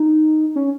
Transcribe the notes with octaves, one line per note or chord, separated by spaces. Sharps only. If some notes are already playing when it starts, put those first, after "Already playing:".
Already playing: D#4
C#4